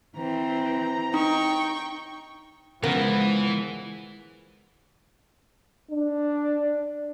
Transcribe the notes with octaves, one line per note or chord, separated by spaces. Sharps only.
E3 C4 A#5
D#4 G5 C#6
C#3 E3 F3 G#3 B3 A#4
D4